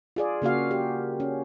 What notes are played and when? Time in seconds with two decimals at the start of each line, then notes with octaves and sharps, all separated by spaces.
0.16 F4 G#4 D5
0.42 C#3 A#3 F#4 F5
0.71 G4
1.20 C#4